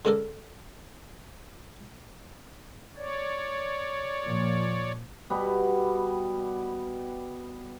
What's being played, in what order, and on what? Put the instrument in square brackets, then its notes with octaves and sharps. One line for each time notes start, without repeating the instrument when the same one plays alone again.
[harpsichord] D3 G#3 C#4 D4 A4 A#4
[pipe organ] C#5 D5
[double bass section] A#2 F3
[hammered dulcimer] B2 G3 B3